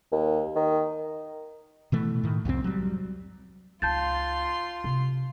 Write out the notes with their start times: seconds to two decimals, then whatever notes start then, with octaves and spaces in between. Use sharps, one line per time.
0.11 D#2
0.55 D#3
1.92 B2 E3 A3
2.24 A2 D#3
2.45 C2 F2 F3 C4
2.64 F#3 G3
3.82 C#2 D#4 F4 A5 C6 G6 A6
4.84 C3